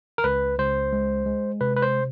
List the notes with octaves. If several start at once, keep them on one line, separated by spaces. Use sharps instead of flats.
A#4
C#2 B4
C#2 C5
G#3
G#3
C3 B4
B4
C5